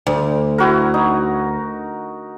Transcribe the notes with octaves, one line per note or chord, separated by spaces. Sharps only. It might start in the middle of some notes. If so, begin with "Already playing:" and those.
D2
E4 F#4 A#4
D#4